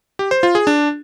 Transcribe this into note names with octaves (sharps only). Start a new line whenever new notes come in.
G4
C5
F4
G#4
D4